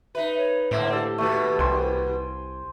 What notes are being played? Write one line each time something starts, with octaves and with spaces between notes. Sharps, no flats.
D#4 B4 E5
C#5
A2 D3 A#3 C4 E5
G4 A4
D#2 B2 A3 A4 B4
C2 C5 G5 G#5